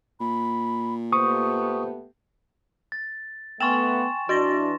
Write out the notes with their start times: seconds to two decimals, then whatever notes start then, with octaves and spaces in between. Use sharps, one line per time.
0.20 A#2 B5
1.13 A3 B3 G4 C5 C#6 D#6
2.92 A6
3.60 A3 B3 G5 G#5 C6 C#6 A6 E7
4.29 E3 D4 F#4 C6 A6 A#6